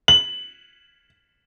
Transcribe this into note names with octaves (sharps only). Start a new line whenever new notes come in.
F#7